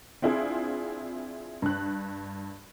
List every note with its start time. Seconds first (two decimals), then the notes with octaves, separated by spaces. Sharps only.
0.22 C4 D4 E4 F4 G#4
1.62 G2 F#6